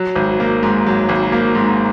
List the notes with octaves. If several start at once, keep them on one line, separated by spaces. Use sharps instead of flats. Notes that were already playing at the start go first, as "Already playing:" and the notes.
Already playing: F#3
G#1
A#3
G#2
F#3
G#1
A#3
G#2